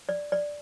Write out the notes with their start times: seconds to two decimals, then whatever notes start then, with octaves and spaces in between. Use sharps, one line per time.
0.09 D5
0.32 D5